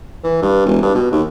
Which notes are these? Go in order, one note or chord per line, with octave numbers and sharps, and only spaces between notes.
E3
G2
E1
G2
B2
D#2